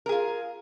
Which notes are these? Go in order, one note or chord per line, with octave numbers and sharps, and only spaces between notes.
F4 G#4 A#4